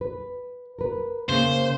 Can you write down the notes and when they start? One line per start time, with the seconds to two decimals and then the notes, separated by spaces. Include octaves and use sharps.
0.01 B4
0.79 A#4 B4
1.29 C#3 A#3 C5